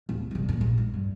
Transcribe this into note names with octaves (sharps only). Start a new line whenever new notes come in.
D1
G1 C2
G2 A#2
A#1
G#2
G2